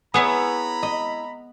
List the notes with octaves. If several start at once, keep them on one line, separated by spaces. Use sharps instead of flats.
B3 E4 G#4 C#5 A#5 B5 D#6
D#5